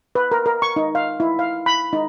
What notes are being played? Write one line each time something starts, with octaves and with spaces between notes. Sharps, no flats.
B4
A#4
A#4
C#6
D#4
F5
E4
F5
B5
D#4